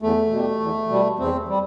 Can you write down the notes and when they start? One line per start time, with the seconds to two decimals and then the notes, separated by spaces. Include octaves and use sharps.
0.02 E2 A3
0.31 B2 G3
0.60 E2
0.89 B2 G3
1.19 E2 C4
1.48 G3